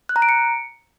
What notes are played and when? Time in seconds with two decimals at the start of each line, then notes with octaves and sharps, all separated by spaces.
0.09 F#6
0.16 A#5
0.22 D7
0.29 C#7